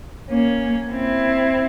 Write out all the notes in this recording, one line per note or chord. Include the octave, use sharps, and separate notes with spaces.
A#3 C#4
C4 E4